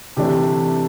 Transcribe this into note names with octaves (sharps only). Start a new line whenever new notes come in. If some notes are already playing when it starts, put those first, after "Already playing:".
C3 E3 A3 D4 G4